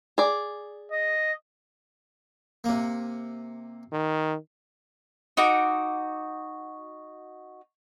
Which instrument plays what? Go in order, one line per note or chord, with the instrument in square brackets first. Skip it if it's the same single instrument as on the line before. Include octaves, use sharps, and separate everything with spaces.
[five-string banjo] G#4 D5
[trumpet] D#5
[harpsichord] C3 A#3
[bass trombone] D#3
[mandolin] D#4 F#4 D6